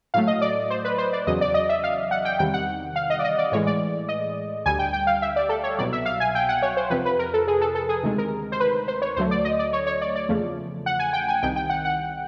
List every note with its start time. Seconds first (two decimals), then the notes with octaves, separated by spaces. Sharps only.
0.14 A2 F#3 A3 F5
0.27 D#5
0.42 D5
0.70 C5
0.85 B4
0.98 C5
1.13 D5
1.27 E2 C#3 F#3 D#5
1.41 D5
1.54 D#5
1.69 E5
1.84 F5
2.11 F#5
2.25 G5
2.39 E2 C3 D#3 G3 G5
2.54 F#5
2.96 F5
3.10 D#5
3.19 D5
3.24 D#5
3.38 D5
3.52 A2 E3 G#3 C#5
3.67 D5
4.09 D#5
4.65 D2 D3 G3 G#5
4.79 G5
4.93 G5
5.07 F5
5.22 E5
5.36 D5
5.49 A4
5.64 C#5
5.78 C2 B2 F#3 D5
5.93 E5
6.06 F5
6.20 G#5
6.35 G5
6.49 F#5
6.62 C#5
6.77 C5
6.90 F2 C3 F3 B4
7.05 B4
7.19 A#4
7.34 A4
7.48 G#4
7.61 A4
7.75 A4
7.89 G#4
8.03 D2 C3 D#3 G#3
8.18 A#4
8.52 C5
8.60 B4
8.88 C5
9.02 C#5
9.16 D2 D3 F#3 A3 C5
9.31 D5
9.45 D#5
9.59 D5
9.73 C#5
9.87 C#5
10.02 D5
10.16 D5
10.29 E2 C#3 F3 A3
10.86 F#5
10.99 G#5
11.13 G5
11.28 G#5
11.42 C2 C3 D#3 G5
11.56 G5
11.70 F#5
11.85 F#5